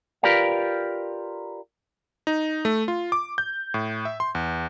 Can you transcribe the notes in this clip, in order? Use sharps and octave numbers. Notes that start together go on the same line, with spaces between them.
F4 G4 A#4 B4 D5 F5
D#4
A3
F4
D6
G6
A2
E5
C6
E2